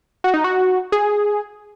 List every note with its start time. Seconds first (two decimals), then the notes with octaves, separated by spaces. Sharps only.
0.24 F#4
0.34 D#4
0.44 F#4
0.92 G#4